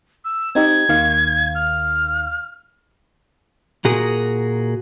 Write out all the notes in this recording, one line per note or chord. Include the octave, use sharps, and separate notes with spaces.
E6
C4 D#4 G4 G#6
D#2 D#3 F5
F6
A#2 F#4 G#4 A#4